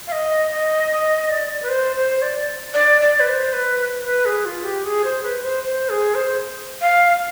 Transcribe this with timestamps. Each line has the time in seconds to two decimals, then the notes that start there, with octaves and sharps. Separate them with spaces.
0.07 F5
0.12 D#5
0.51 D#5
0.91 D#5
1.30 D5
1.63 B4
1.69 C5
1.96 C5
2.22 D5
2.74 D5
3.01 D5
3.20 B4
3.27 C5
3.53 B4
3.80 B4
4.05 B4
4.26 G#4
4.45 F4
4.64 G4
4.84 G#4
5.04 C5
5.23 B4
5.43 C5
5.63 C5
5.89 G#4
6.15 C5
6.81 F5